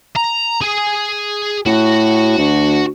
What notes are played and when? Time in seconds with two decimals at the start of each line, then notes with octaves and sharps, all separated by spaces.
0.16 A#5
0.62 G#4 G#5
1.66 A2 F#4
2.38 D2